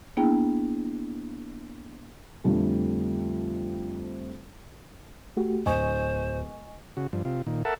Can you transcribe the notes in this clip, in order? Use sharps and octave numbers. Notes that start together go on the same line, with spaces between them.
A#3 B3 D4 E4 G#4 G5
F2 D3 F3 G3 A3 C4
A3 F#4 G4
D1 C5 D#5 G#5 C#6
C#3 F#4
G2 F3
C3 F4
A#2 D#3
A4 A#4 E5 F#5 A5